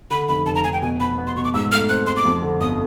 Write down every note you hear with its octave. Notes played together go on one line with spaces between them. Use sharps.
D3 B5
F1 B5
F1 A5
A#5
F1 G#5
G5
B2 G#5
B3 B5
B3
C6
B2 C#6
D6
G#2 E6
A3 F6
C4 F#6
C4 C6
D6
F2
D3
G1 D#6